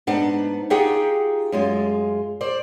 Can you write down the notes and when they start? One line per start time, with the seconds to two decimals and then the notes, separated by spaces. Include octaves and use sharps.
0.07 G#2 B3 D4 D#4 F#5
0.70 D#4 F4 G4 G#4 F#5 G5
1.52 F#2 G#3 F4
2.41 C5 D5